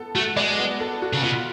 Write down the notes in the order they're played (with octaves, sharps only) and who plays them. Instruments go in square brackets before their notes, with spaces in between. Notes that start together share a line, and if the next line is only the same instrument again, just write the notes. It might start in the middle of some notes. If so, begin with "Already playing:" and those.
Already playing: [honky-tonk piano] B3 A4
[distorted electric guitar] A3 [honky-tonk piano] F#4
[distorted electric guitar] G#3 [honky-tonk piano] D5
[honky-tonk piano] B3
A4
F#4
[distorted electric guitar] C#3
[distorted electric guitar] B2 [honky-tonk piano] F4